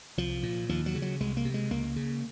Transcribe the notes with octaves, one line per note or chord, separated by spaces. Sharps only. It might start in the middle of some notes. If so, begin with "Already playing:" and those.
C2 F3
A#2
D#2 F3
F#3
C#3
F#3
C2 G#3
A#3
C3
G#3
C#2 A#3
C#3